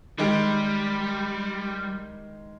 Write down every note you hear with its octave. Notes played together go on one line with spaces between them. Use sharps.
D#3 G3 G#3 G4